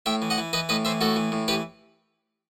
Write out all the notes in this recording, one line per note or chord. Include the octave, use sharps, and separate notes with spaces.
A2 E5 G5
E3
D#5 F#5
E3
E3 B4 D#5
A2 B4 D#5
E3 C5 E5
A2 F#4 A4
E3
A2
E3 G4 B4